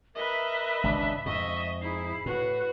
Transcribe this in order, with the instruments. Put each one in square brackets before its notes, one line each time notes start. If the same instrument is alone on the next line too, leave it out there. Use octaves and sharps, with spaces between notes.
[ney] A#4 [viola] B4 D#5 [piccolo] E5
[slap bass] G#1 C#2 [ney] D4
[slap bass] F2 G#2 [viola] D#5 [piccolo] E5 [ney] C#6
[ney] D#4 [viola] E4 G#4 [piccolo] C7
[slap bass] A2 [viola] F#4 [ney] B4